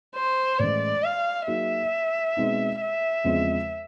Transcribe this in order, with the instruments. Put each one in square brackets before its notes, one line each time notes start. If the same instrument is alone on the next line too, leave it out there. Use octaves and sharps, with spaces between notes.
[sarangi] C5
[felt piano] A2 E3 G#3 C#4 [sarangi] D5
[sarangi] F5
[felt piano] F#3 A#3 D#4 G#4 [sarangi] E5
[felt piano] B2 G#3 C4 D#4
[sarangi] E5
[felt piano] E2 C#3 F3 G#3 C4